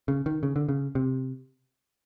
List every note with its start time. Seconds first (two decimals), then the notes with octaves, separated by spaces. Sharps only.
0.08 C#3
0.26 D#3
0.43 C#3
0.56 D3
0.69 C#3
0.95 C3